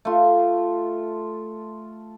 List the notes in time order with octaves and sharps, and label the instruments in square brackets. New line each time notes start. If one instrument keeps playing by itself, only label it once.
[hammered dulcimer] A3 F4